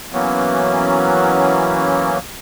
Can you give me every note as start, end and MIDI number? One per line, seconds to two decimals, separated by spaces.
0.13 2.18 52
0.13 2.18 54
0.13 2.18 58
0.13 2.18 59
0.13 2.18 61